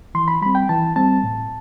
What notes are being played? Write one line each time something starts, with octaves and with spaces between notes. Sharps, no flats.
E3 C6
B5
G3 C4 B5
G5
E3 A5
G3 C4 A5
A2